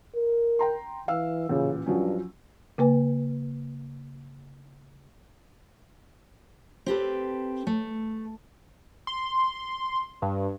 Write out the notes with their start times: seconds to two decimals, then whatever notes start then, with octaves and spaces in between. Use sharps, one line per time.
0.15 A#4
0.59 G5 A#5 C6
1.08 E3 F5 E6
1.49 A1 A#2 C#3
1.86 G2 F3 F#3 C#4
2.78 C#3 A#3 B4 G#5
6.86 C4 G4 A4 B4
7.67 A3
9.07 C6
10.22 G2